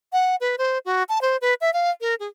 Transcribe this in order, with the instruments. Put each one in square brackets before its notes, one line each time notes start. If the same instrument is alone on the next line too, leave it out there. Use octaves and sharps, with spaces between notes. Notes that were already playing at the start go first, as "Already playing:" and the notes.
[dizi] F#5
B4
C5
F#4
A5
C5
B4
E5
F5
A#4
G#4